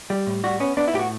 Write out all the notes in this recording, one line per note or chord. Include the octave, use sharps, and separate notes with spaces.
G3
A2
G3 F#4
B3 C#4
B3 D4
E4
A2 G4
F#4